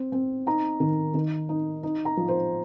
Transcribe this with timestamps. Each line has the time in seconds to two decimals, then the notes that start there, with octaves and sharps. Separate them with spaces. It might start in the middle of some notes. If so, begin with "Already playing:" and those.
Already playing: C4
0.12 C4
0.47 D#4 A#5
0.80 D#3
1.14 D#3
1.49 D#4
1.83 D#4
2.05 A#5
2.17 F3
2.28 C5